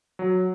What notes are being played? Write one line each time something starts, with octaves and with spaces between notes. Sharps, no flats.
F#3